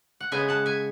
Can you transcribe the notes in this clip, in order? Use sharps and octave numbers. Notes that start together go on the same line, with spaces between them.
F#5
C#3 G#3 B3 E5 G#5
F#5 A5
E5 G#5